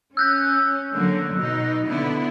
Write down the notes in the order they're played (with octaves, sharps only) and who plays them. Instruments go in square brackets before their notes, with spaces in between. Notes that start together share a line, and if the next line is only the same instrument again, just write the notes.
[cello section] C#4 [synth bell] E6 F#6 G6
[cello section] D3 F#3 A#3
B2 D#4
D3 B3 E4